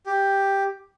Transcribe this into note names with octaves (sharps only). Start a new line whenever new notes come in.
G4